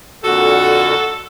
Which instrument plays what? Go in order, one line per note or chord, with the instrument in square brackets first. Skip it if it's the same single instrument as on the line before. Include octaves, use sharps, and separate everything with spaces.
[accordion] F2 A#2 D3 [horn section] F#4 [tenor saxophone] A4